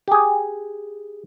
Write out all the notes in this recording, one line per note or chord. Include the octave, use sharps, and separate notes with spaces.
G4 G#4